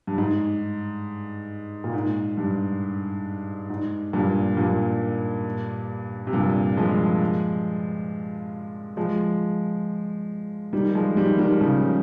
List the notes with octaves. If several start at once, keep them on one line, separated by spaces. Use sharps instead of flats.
G2
G#2
A#2
G#2
G2
G#2
G2 A#2
G2 A#2
C3
G2 A#2
F3 G#3
F3 G#3
D#3 G3
F3 G#3
D#3 G3
D#3 G3
C#3 F3